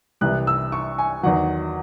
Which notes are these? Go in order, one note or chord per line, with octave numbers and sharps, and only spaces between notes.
C2 C3 E3 F#6
E6
C#6
G#5
E2 D#3 F#3 F#5